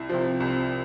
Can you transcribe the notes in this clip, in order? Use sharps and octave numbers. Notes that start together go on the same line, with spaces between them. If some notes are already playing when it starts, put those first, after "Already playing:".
Already playing: C2 E4
C3 F3
C2